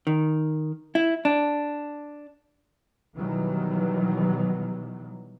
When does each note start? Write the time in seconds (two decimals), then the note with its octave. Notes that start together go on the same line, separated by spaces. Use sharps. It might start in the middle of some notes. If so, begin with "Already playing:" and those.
0.07 D#3
0.95 E4
1.25 D4
3.17 B2 D#3 E3 F#3 G3